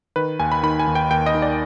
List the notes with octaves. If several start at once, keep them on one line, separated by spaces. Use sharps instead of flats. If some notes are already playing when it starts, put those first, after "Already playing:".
D#3 B4
D#2 G#5
B5
D#3 B5
G#5
D#2
G5
D#2 G5
D#5
D#3
D5